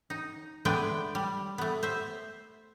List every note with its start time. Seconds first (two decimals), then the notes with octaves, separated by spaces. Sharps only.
0.10 D#4
0.65 G#3 A3 B3 D4 B4 G5
1.15 G3
1.58 A3 B3
1.83 C5 E5